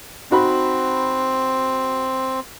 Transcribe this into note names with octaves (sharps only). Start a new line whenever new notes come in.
C4 D#4 F#4 B5